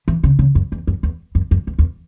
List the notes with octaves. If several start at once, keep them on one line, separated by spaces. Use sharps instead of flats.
E3
C#3
C#3
F#2
E2
F#2
E2
F#2
F#2
E2
E2